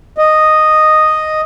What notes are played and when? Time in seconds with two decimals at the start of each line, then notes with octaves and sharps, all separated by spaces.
0.18 D#5